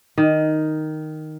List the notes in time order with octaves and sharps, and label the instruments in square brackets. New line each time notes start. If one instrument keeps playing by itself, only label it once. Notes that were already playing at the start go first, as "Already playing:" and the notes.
[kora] D#3